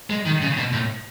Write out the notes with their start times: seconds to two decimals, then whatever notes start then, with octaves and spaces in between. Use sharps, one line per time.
0.10 G#3
0.26 D#3
0.41 C#3
0.57 B2
0.73 A2